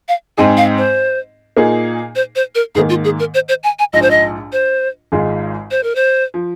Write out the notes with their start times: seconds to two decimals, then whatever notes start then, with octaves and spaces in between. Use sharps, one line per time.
0.08 F5
0.38 G#2 G#3 C4 D#4 G#4 G#5
0.57 F5
0.77 C5
1.57 A#2 A#3 D#4 G#4
2.15 C5
2.36 C5
2.55 A#4
2.75 G#2 D#3 A#3 G#4
2.89 F4
3.04 G#4
3.19 A#4
3.34 C5
3.49 C5
3.63 G#5
3.79 G#5
3.93 A#1 G#2 F3 D#5
4.02 C5
4.11 D#5
4.52 C5
5.12 G#1 G#2 G#3 F4 G#4
5.71 C5
5.83 A#4
5.95 C5
6.34 F3